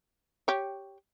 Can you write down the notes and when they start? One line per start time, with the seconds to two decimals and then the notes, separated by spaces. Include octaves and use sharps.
0.48 G4 C#5